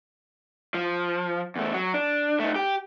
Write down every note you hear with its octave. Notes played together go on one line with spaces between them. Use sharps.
F3
E2 A3
F#3
D4
A3 D#4
G4